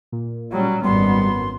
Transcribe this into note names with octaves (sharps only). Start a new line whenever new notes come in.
A#2
F#3 G3 C#4
G#1 F#2 G3 B3 C6